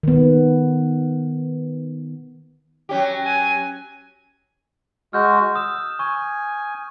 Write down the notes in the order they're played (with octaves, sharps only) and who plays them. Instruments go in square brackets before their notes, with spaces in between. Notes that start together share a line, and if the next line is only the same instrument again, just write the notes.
[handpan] D#3 B3
[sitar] F#3 C#4 G4
[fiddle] G#5
[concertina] G#3 F#4 [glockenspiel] F6 G6
[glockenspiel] D#6 [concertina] E6
[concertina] G#5 [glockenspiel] C#6